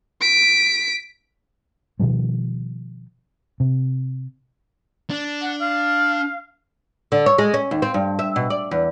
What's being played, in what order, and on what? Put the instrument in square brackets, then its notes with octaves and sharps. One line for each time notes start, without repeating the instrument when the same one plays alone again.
[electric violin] B6 D7
[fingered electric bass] B2 D#3 F3 G3
C3
[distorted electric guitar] D4
[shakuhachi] F#5
F5
[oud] D3
C#5
G#3
C#4
D#2
C4
G2
E5
B2
D5
E2